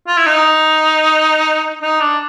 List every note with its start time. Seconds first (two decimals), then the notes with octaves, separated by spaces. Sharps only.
0.08 F4
0.17 E4
0.26 D#4
1.82 D#4
2.01 D4